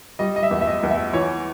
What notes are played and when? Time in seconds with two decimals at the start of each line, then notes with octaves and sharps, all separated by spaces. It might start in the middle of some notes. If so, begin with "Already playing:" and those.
0.19 G3 D#5
0.36 D#5
0.43 E5
0.51 E2
0.61 E5
0.67 D#5
0.83 E2
0.90 E5
1.13 E3 C#5